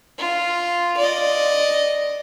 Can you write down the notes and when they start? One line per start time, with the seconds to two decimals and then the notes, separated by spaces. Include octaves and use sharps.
0.18 F4
0.97 D5 D#5